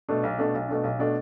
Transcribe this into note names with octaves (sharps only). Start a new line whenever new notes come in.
B2 A3 D4
B1
B2 A3 D4
B1
B2 A3 D4
B1
B2 A3 D4